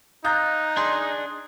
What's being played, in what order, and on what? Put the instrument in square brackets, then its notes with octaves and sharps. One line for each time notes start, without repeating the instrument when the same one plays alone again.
[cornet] D#4 [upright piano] F5 A#5 G6 [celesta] D#6 F#6 A6
[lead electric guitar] D4 G#4 [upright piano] C6